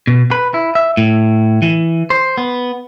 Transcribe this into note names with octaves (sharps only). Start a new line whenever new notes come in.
B2
B4
E4
E5
A2
E3
C5
B3